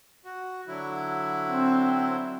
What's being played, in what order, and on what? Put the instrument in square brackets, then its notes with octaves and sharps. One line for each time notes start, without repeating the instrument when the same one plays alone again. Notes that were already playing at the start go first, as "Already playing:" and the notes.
[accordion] F#4
D3 F#3 E4
[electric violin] C4